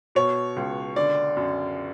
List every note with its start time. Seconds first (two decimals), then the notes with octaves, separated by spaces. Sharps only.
0.15 B2 C#5
0.56 C#2
0.96 D3 D5
1.37 F#2